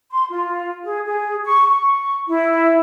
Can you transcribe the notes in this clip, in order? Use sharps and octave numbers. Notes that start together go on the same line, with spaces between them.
C6
F4
G#4
G#4
C#6
C#6
E4